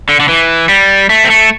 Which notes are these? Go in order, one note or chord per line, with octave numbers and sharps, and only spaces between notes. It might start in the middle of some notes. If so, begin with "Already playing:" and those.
D3
D3
E3
G3
A3
C4
A3